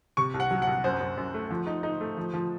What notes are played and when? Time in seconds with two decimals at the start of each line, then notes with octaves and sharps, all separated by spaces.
0.17 C3 C#6
0.34 C2
0.40 F#5
0.51 F#3
0.62 F#5
0.67 C2
0.84 F#2 C5
1.00 F#2
1.17 F#2
1.34 A3
1.50 F3
1.67 D#4
1.83 D#4
2.01 A3
2.17 F3
2.34 F3